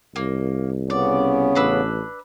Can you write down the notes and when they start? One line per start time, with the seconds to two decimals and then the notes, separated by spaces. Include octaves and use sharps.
0.16 C2 A#3
0.90 C#3 B3 C#4 D5
1.55 A1 D4 B4 E6